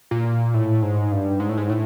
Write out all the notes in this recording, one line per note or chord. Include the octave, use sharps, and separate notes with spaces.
A#2
A2
G#2
G2
G#2
A2
G#2
A2